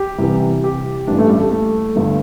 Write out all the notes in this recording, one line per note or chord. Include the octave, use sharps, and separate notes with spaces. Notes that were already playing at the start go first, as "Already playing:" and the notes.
Already playing: G4
C2 C3 E3
G4
A1 G2 E3 D4
A3
G3
A3
A3
G1 G2 D3